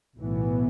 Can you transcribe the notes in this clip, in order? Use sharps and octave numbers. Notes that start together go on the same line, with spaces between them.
B1 A2 E3 B3